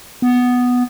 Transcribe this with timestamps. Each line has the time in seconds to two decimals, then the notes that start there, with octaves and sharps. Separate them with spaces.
0.22 B3